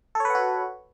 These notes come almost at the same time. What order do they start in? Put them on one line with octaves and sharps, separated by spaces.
A4 C#5 B4 F#5 F#4